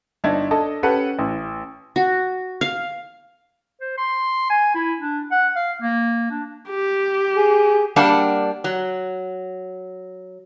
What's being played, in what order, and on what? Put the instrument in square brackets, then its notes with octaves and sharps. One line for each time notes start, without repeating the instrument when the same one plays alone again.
[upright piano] G1 D4 D#4 E5 G#6
D4 A4 D#5 A5
C#4 G4 A4 B4 F#5
A1
[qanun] F#4
F5
[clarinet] C5
C6
G#5
E4
D4
F#5
F5
A#3
D4
[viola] G4
[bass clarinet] G#4
[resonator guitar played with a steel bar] G3 A#3 D4 F#5 A5
F#3